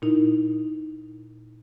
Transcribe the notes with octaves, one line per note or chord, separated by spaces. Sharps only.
A#2 D#4 E4